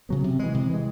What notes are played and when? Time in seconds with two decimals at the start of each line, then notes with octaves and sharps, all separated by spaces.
0.09 C#3 F#3 B3
0.24 C3
0.39 E3 G#3
0.54 C3
0.70 E3 G#3